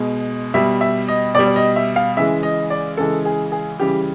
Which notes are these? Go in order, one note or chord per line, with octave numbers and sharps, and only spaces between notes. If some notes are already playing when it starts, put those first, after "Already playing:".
Already playing: B2 G#3
B2 G3 E5
E5
D#5
B2 G3 D5
D5
D#5
E5
F5
C#3 E3 G#3 E5
D#5
D5
C#3 E3 G#3 A4
G#4
G#4
C#3 E3 G3 G4